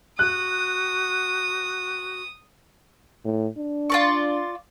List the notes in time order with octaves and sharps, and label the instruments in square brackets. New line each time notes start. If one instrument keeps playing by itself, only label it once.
[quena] F#4 [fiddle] D#6 [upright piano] F#6
[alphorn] A2
D4
[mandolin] F4 D5 C#6